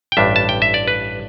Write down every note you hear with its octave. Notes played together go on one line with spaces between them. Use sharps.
G5
A1 G2 G3 D4 E5
A5
G5
E5
D5
B4